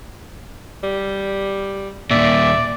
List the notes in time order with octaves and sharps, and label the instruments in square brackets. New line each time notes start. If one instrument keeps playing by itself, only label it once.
[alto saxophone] G3
[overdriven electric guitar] D#2 A#2 [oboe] D5 [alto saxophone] E5